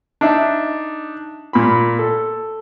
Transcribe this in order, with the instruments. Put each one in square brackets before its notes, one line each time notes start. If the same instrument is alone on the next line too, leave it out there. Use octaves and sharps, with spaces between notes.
[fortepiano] D4 D#4 E5
A#2 B5
A4